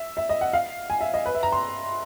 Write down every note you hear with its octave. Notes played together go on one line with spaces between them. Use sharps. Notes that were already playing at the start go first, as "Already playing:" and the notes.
Already playing: E5
E5
D#5
F#5
F5
G#5
E5
D#5
B4
E5
A#5
C6